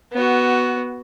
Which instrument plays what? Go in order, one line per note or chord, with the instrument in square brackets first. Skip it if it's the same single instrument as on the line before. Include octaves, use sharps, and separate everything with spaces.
[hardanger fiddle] B3 F#4